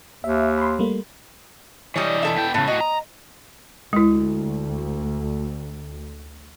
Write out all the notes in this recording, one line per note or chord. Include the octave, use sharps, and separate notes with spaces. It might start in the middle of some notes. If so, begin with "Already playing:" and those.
D#2 E5
B5 C6
G3 A3 A#3
E3 G3 C#5 D#5
E4 A4 E5
B3 G5
A2 C#3 A3 B3
A2 F#4 D#5
A#5
D2 G#3 E4